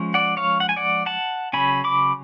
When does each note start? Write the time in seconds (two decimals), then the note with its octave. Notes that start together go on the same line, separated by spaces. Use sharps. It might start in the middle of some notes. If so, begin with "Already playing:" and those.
Already playing: F3 G#3 C#4
0.14 D5 F#5
0.37 C#5 F5
0.60 F#5
0.69 G#5
0.76 D5 F#5
1.06 F#5 A5
1.53 C#3 F#3 C#4 G#5 B5
1.84 B5 D6